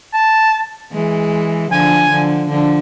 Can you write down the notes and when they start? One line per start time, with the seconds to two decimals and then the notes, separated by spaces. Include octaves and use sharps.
0.13 A5
0.92 E3 G#3
1.71 D3 F3 G#5
2.10 D3 F3
2.50 D3 F3